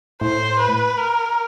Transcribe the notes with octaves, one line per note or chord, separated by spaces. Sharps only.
A2 C5
B4
A#4